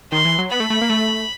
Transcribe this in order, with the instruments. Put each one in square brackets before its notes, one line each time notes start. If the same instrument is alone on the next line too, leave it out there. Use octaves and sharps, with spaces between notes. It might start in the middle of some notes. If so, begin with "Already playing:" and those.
[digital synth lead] D#3 [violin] C6
[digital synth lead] E3
F#3
[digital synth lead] B3 [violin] B5
[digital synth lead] A3
A3
A#3
A3